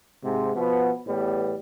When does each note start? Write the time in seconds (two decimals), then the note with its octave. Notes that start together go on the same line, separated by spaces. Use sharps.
0.23 G#2 C3
0.55 B2 F3 B3
1.07 E2 A2 G3 B3